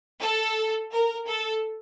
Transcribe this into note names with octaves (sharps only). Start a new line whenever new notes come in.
A4
A#4
A4